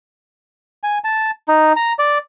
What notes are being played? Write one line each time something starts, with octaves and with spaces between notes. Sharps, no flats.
G#5
A5
D#4
A#5
D5